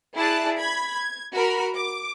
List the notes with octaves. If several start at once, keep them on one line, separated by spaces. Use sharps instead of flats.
E4 G#4 D5 A5 F#6
B5 G#6
G#6
F#4 A#4 B5
D6